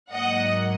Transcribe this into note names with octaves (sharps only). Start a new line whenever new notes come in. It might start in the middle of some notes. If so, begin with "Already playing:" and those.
G#2 F#3 A#3 D#5 F#5